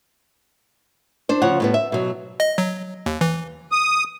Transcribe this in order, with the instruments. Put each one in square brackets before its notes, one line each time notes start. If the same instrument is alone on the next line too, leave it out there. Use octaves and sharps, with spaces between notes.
[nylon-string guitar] D4 C5
D2 C#3 F3 C#5 F#5
A2 G3 B3
E5
B2 F#3
[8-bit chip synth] D#5
F#3
D#2
E3
[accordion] D#6